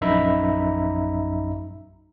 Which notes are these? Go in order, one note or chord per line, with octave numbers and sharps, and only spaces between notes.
A#1 F#2 D#4 E5 A#5 B5